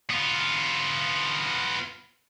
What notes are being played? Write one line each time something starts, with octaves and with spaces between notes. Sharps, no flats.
B3 F4